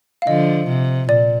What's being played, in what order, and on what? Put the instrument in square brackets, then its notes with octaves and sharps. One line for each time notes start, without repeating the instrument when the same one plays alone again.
[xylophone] F5
[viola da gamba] D3 F3 [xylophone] D#5
[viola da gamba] C3
[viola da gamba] A#2 [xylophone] D5